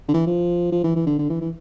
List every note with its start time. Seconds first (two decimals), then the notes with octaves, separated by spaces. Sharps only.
0.08 D3
0.14 E3
0.26 F3
0.72 F3
0.84 E3
0.96 E3
1.06 D3
1.19 D3
1.30 E3
1.41 E3